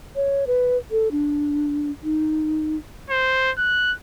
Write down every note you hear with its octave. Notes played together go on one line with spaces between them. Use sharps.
C#5
B4
A4
D4
D#4
C5
F#6